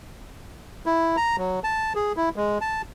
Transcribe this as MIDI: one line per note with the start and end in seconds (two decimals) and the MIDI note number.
0.86 1.16 64
1.17 1.36 82
1.38 1.60 54
1.64 1.93 81
1.95 2.13 68
2.17 2.29 64
2.36 2.58 56
2.61 2.82 81